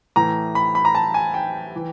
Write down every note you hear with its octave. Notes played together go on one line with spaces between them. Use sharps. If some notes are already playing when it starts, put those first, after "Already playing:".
A2 E3 A#5
B5
B5
A#5
A5
G#5
G5
E3